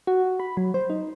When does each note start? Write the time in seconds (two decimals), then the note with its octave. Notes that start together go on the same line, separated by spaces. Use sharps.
0.07 F#4
0.40 B5
0.57 F#3
0.74 C5
0.90 D#4